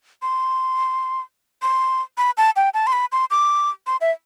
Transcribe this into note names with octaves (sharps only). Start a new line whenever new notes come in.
C6
C6
B5
A5
G5
A5
C6
B5
C6
D6
C6
E5